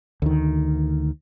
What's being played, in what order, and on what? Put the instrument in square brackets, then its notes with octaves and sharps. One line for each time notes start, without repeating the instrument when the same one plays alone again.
[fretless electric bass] D2 D#3